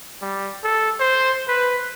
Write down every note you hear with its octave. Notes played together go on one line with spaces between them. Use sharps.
G3
A4
C5
B4